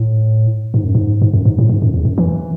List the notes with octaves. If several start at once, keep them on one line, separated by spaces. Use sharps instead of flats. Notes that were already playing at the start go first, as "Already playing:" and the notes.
Already playing: A2
G#2
F#2
G#2
G#2
F#2
G#2
A2
G#2
F#2
E2
F#2
E3